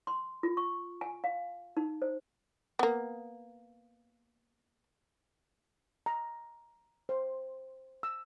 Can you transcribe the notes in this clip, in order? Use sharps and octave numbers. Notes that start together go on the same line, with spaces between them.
C6
F4
C#6
G#5
F5
D#4
C5
A#3 B3
A#5
C5
E6